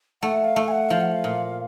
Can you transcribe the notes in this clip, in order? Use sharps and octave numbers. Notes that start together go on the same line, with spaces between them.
A3 F#5
F5
A3
G#5
F#5
F3 F5
F#5
F5
A#2